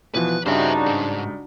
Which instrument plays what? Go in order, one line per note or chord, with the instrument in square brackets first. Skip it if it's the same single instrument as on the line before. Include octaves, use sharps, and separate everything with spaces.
[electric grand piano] B2 E3 F3 [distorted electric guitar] B4
[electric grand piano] G2 C#3 [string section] D4 D#4 F#4 [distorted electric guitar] C5 E5
[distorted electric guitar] G#2